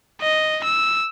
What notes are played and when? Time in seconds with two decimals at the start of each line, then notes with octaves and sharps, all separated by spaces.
0.21 D#5
0.64 E6